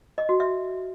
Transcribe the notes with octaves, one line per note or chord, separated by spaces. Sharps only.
D#5
F#4
E5